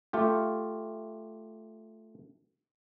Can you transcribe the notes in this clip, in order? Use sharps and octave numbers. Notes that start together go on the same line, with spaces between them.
A3 F4 G4